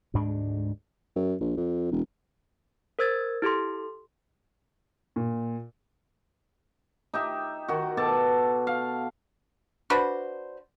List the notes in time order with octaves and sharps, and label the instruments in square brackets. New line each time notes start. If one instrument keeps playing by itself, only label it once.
[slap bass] D2 G#2 G#3 D4
[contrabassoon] F#2
A#1
F2
E1
[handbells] A#4 C5 E6 G#6 A6
E4 G4 A4 C6
[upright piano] A#2
[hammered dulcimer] D#4 G4 E5
D#3 F#4
B2 A4 A5 D6
F5
[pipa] D4 F#4 B4 C5